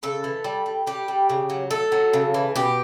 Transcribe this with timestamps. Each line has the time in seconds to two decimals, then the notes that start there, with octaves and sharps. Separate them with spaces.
0.03 C#3 A4
0.24 E3
0.44 G3
0.66 G3
0.87 G3 G4
1.08 G3
1.30 C#3
1.50 F#3
1.71 A3 A4
1.92 F#3
2.13 C#3
2.34 E3
2.56 B2 G4